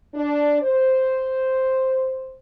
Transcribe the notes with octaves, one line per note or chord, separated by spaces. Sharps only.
D4
C5